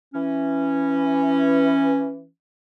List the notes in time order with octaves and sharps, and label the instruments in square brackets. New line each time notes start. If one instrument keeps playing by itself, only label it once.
[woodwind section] E3 C#4